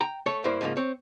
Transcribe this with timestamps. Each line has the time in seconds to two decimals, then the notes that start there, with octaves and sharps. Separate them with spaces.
0.01 G5 A#5
0.26 A3 A4 C#5
0.44 G2 A#3 E4 C5
0.61 G#2 C#3 F3 G#3 A#3
0.77 C4 C#5